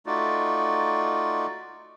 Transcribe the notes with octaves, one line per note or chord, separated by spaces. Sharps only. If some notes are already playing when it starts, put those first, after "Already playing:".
A3 D#4 F4 F#4 D5